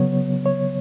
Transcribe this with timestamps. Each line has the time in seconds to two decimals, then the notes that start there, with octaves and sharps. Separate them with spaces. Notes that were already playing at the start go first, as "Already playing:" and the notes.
Already playing: C#3 F#3 B3 C#5
0.46 C#5